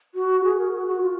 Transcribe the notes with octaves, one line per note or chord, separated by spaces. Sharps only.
F#4
G#4
A#4
F#4
F#4
F4